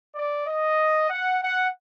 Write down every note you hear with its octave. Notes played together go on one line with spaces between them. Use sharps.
D5
D#5
F#5
F#5